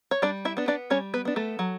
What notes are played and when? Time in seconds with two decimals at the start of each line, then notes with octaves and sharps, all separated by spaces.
0.11 C#5
0.22 G3 D4 D5
0.45 E4 E5
0.57 B3 D4
0.68 D4 D5
0.90 G3 C#4 C#5
1.14 B3 B4
1.25 B3 D4
1.36 A3 A4
1.59 F#3